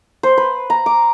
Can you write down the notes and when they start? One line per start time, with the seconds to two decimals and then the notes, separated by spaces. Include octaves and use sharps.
0.23 C5
0.37 B4
0.70 A#5
0.86 D6